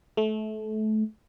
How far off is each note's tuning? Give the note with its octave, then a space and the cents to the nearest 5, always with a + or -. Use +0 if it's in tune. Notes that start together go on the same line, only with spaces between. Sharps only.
A3 -25